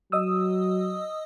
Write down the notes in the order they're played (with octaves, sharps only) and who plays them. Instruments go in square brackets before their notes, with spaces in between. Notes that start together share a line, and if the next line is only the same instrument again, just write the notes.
[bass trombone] F#3 [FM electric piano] D#5 D#6 E6